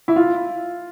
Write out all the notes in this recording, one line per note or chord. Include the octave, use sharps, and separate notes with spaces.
E4
F4